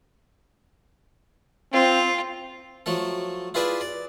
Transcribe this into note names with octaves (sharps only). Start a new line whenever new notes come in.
C4 F4
F3 F#3 A3 A4
E4 F4 G#4 B4 D5 E5
D5